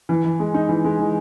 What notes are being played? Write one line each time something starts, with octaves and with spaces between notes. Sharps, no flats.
E3
E3
G#3
D#4
E3
G#3
E3